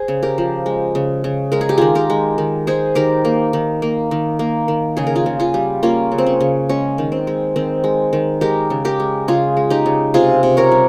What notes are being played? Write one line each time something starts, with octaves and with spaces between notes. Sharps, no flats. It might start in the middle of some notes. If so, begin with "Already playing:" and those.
Already playing: G#4 C5
C#3
G4 A#4
F3
G#3
C#3
C#3
G#3 A#4
G#4
G4
D#3 F4 G#4
G4 A#4
G#3
D#3
G#3 G#4 C5
D#3 G4 A#4
A#3
D#3
A#3
D#3
A#3
D#3
C#3 G#4
A#4
F4 G#4
C#3
F4 G#4
G3
A#3 C#4 F4
C#3
C4
C#4
C#3
G#3 C#4
D#3
C4
G#3
D#3 C4
G#3
D#3
G#3 G4 A#4
C#3
G4 A#4
G#3
C#3 F4 G#4
G#3
D#4 G4
C#3
C3 F4 G#4
C3
A#4 C#5
G3